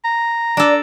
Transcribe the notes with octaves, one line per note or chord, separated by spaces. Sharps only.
A#5
D4 A4 D5